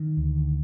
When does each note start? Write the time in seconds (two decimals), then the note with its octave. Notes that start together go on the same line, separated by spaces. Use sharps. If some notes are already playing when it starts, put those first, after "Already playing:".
Already playing: D#3
0.17 D2